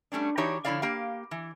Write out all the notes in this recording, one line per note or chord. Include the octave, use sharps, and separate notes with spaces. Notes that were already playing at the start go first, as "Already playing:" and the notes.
G3 A3 C#4 D4
E3 D4 D#4 F#4 G4 C#5
D3 F3 E4 C#5 D5 F5
A#3 G4 F5
E3